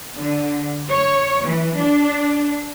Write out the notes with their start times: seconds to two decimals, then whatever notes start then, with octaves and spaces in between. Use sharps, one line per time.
0.17 D3
0.88 C#5
1.45 E3
1.77 D4